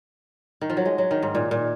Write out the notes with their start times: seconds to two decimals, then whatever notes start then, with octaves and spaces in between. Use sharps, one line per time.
0.61 D#3
0.70 F3
0.77 F#3
0.85 G#3
0.98 F#3
1.11 D#3
1.23 G#2
1.35 A#2
1.51 A#2